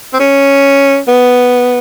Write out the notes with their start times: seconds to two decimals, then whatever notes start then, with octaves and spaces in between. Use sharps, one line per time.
0.13 C4
0.20 C#4
1.08 B3